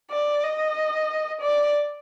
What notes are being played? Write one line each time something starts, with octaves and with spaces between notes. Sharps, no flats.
D5
D#5
D5